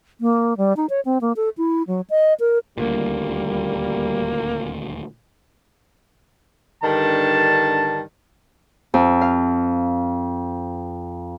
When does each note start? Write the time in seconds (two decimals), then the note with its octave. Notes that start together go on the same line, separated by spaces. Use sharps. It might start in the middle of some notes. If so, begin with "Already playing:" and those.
0.21 A#3
0.57 G3
0.77 D#4
0.90 C#5
1.05 C4
1.21 A#3
1.36 A4
1.58 E4
1.87 F#3
2.10 D#5
2.40 A#4
2.78 D#1 D2 A#2 G3 A#3
6.83 G2 D3 D#3 A5
8.94 F2
9.21 F5